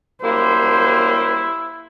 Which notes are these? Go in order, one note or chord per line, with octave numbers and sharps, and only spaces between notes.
F#2 G3 A#3 E4 C5